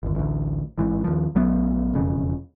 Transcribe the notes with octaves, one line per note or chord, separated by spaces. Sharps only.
G1 D#2
A1 D2
A1 G#2 E3
D#2 F3
A#1 F#3 A3 B3
E1 F2 C#3